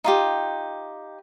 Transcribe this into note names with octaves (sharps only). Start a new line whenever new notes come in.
D#4 F4 G4